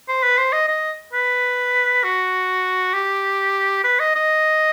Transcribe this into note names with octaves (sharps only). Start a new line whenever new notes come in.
C5
B4
C5
D#5
D#5
B4
F#4
G4
B4
D#5
D#5